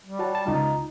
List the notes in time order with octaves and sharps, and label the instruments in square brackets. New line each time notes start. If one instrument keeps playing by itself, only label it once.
[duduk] G3
[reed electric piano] F#4 C#5 A5
A5
[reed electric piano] C#2 F4 [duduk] D#4